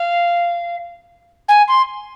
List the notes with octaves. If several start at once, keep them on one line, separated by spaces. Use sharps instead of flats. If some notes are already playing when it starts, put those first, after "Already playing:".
Already playing: F5
G#5
C6